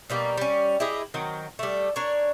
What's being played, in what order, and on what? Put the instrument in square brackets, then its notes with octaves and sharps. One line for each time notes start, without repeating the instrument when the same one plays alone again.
[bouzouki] B2 G3 A#3
G3 C#4
E4 G4 G#4 D#5
D#3 F#3 C4
G3 A3
D4 A#4 C#5